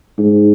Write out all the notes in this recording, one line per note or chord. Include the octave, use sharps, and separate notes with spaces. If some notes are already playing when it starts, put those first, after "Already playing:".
G#2